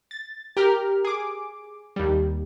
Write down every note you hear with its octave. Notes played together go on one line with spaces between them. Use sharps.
A6
G4 A#4 F6
G#4 D6
D#2 G3